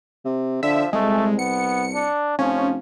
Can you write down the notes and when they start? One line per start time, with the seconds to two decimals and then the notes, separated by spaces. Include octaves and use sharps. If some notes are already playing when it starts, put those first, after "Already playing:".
0.25 C3
0.63 D3 F3 E5
0.93 C2 G#3 A3
1.39 B3 C#7
1.94 D4
2.39 F1 F3 C#4